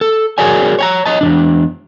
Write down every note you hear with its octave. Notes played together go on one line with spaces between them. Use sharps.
A4
F#4 G#4 A#4 C#5 D5 G#5
C#5 G#5 A#5
C#5 D#5 A5
E2 C#3 D4